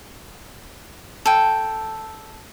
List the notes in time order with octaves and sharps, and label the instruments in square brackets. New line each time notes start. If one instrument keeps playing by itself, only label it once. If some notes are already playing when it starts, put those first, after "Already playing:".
[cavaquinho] A4 G5